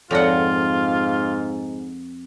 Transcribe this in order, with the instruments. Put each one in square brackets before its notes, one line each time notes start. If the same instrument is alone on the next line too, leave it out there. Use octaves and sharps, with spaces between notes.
[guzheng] F2 F#5 [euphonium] G#2 [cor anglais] F4 [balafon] A4 C#5 D5